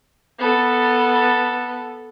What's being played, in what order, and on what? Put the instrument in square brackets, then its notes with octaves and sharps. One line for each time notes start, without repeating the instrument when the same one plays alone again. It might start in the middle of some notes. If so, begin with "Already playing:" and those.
[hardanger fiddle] B3 A4